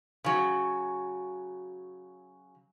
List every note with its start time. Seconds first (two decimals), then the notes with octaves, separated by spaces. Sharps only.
0.24 C#3 F#3